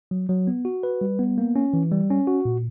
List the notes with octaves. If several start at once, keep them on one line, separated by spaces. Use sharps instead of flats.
F#3
F#3
B3
F#4
B4
G3
B3
A#3
C#4
E3
G3
C#4
F#4
A#2